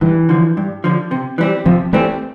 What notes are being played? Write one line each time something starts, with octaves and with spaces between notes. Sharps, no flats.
G2 E3
D3 F3
G2
D3 F3
C3
E3 G3 C4
C3 F3
E3 G3 A3 C4